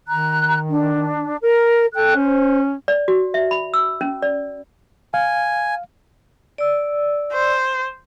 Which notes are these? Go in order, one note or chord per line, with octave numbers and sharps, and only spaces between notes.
D#3 A#5 F#6
D4
A#4
A4 G5 F#6
C#4 C5
D5
F#4
E5
B5
E6
C#4
D5
F5 G#5
D5 E6
C5